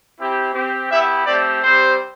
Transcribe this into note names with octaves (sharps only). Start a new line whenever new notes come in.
C4 E4 G4
C4 G4
B3 E4 G4 E5
A3 C4 G4 D5
G3 C4 G4 C5